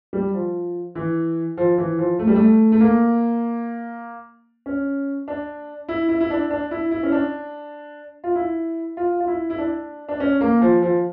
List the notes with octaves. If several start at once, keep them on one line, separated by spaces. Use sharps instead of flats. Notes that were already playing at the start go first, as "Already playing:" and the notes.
G3
F3
E3
F3
E3
F3
A3
G3
A3
A3
A#3
C#4
D4
E4
E4
E4
D4
D4
E4
E4
C#4
D4
F4
E4
F4
F4
E4
E4
D4
D4
C#4
A#3
F3
F3